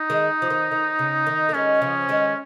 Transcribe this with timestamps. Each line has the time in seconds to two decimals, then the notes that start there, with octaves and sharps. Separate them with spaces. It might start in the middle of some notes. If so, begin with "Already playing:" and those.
Already playing: D#4
0.10 D#3 G#3
0.42 F3
0.50 D#3
0.71 D#3
0.99 C#3
1.27 D#3
1.49 A#3
1.54 D#3 G#3 C#4
1.82 C#3 F3
2.09 D#3 G#3